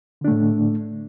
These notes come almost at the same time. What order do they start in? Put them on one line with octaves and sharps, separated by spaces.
D3 D4 A3 A2